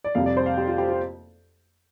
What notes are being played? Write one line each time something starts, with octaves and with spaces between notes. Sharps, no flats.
D5
F2 C3 G3 F5
D5
C5
F5
G4
F4
G4
F4